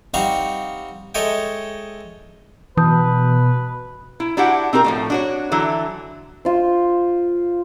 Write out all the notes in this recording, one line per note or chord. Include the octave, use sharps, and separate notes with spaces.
G3 C4 D#4 F5 F#5 C#6
G#3 A4 C#5 D#5 E5 G5
B2 E3 B4 A5 D#6 G6
E4
D4 E4 F#4 G4 F#5
C4 D#4 G4 A#4
A2 F3 A3
D4 F#4 C#5
D3 E3 F#3 E4
F4 C5